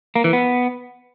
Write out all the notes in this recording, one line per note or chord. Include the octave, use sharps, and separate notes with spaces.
A#3
E3
B3